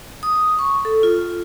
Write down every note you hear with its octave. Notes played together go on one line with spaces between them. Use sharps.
D#6
C#6
A4
F4